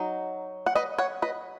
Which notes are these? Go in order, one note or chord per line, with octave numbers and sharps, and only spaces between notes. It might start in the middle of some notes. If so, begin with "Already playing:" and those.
Already playing: F#3 D#4
F#5
B4 D#5
C#5 F#5
B4 D#5